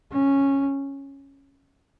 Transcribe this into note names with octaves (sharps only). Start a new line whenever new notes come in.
C#4